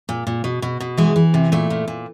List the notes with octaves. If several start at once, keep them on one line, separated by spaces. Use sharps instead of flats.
A#2
A#2
B2
B2
B2
E3 G#3
E3
C3
A#2 A3
A#2
A#2